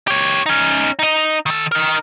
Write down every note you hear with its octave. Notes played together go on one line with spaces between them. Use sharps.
G4 C#5
C#4 D#4
D#4 D#5
D#3 A4
D#4 A#4